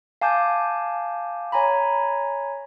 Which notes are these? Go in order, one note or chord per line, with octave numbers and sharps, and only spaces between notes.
F5 G#5 A5 D6 G6
C#5 G#5 A#5 B5